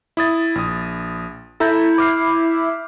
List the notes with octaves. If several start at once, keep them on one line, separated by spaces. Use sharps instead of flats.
E4 D#6 A6
A#1 D#6
E4 A4 A#5 G6
D6 F6 C7